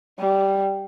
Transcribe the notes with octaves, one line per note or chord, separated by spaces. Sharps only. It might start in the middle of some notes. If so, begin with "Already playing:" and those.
G3